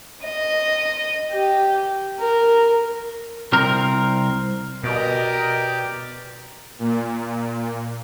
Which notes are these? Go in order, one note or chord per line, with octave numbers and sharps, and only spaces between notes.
D#5
G4
A#4
C2 C4 A#4
B2 G4 A#4 D5 D#5
A#2